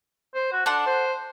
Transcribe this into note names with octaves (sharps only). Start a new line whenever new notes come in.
C5
F#4
D4 A4 F#5 C6
C5